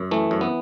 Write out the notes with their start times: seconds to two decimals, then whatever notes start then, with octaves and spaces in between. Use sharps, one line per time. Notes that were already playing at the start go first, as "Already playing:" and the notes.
Already playing: F#2
0.11 E3 A3
0.31 F#2
0.41 B3